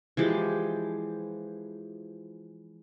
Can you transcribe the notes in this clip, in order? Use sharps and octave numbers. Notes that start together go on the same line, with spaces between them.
E3 F3 G#3 G4